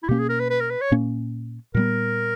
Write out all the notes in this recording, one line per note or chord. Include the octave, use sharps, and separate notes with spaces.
E4
B2 A#3 C#4 G4
G#4
A#4
B4
B4
A#4
B4
C#5
A#2 A#3 C#4
A#2 G3 B3 A#4